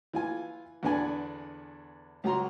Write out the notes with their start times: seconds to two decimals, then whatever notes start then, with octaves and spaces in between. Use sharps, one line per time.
0.14 E3 F4 G#5
0.83 E2 D3 B3 D4 G#5
2.24 C#2 F#3 F#4 A#5 C6